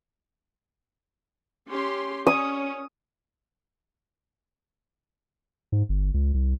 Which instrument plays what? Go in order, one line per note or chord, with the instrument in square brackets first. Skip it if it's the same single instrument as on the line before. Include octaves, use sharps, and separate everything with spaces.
[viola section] C#4 G4 C6
[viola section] C#4 [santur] D#6
[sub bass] G#2
G1
C#2
C2